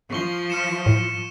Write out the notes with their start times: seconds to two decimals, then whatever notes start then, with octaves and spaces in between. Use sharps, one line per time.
0.13 F3 C#6 G7
0.50 F6 C#7 E7
0.86 A2